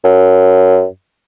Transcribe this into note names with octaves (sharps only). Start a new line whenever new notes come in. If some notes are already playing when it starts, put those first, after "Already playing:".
F#2